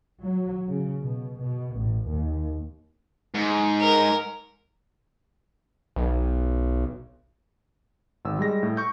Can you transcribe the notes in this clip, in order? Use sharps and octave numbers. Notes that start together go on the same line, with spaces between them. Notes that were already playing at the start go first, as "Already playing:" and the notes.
F#3
C#3
B2
B2
A1
D#2
G#2
A#4
B1
G#1 E6
G3 G#3 A#6
A2
C#6 G6